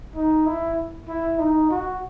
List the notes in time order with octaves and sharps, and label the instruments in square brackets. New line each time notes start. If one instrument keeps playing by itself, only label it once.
[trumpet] D#4
E4
E4
D#4
F#4